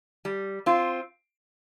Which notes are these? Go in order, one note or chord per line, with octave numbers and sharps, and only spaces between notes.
G3
C4 F4